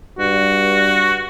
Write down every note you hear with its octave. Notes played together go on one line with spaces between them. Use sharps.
G2 F#4